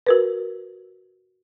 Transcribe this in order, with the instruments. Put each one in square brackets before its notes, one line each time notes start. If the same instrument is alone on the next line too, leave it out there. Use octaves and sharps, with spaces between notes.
[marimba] F#4 A#4 B4